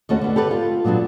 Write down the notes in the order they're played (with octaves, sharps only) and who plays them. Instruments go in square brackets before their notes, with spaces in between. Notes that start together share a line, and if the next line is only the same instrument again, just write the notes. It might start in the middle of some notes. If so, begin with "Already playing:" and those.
[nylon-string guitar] D#2 A3 C#4 F#4
D3 B3
G4 A4 B4 D5
F4
A#2 F#3 B3 D4